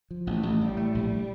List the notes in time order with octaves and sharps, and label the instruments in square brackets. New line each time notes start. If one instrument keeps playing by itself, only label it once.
[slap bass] F3
[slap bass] A1 [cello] A3
[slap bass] A1
[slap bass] A2 [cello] G3
[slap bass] A3
A#1